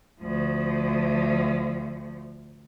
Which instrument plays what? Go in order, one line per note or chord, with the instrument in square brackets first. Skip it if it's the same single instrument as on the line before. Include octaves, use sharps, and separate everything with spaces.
[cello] D2 F3